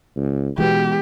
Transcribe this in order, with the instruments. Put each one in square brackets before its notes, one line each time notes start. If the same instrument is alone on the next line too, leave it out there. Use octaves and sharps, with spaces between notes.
[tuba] C#2
[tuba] B2 [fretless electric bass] E3 G#3 B3 [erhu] G4